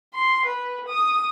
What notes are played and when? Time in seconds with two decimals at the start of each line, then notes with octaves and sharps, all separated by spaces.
0.14 C6
0.46 B4
0.88 D#6